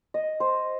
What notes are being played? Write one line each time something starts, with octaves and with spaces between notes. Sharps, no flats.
D#5
C5